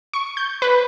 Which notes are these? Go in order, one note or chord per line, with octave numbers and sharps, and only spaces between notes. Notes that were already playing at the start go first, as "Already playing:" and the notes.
C#6
G6
B4